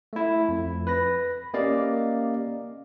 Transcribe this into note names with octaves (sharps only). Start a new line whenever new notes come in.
A3 E4
F2
B4 B5 A#6
A#3 C#4 G4 D5 D#5 F5